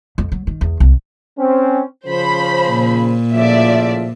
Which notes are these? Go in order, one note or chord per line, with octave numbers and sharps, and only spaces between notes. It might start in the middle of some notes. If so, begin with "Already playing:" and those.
F2
F#3
D#3
E2
C2
C4 C#4
C#3 F3 C5 B5
A#2
A2 C#3 F3 D5 E5